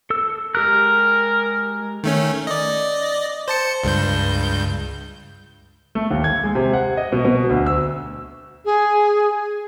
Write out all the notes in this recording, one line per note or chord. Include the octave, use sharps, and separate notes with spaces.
A4 E6
G#3 G4 A#4 F#6
D#3 A3 C#4
D5 D#5
C5 A5 C#7
C#2 G2 G6
A3
D#2
G#6
G#3
C3
F#5
D#5
B2
B2
D2
E6
G#4